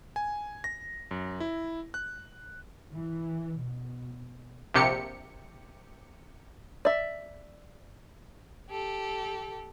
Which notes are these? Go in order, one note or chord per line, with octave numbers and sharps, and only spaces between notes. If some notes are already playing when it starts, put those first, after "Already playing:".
G#5
A#6
F#2
E4
F#6
E3
B2
A#1 C3 G4 C#7
D5 E5
G4 A4